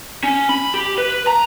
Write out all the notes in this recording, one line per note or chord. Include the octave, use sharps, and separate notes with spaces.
C#4
B5
G4
B4
A#5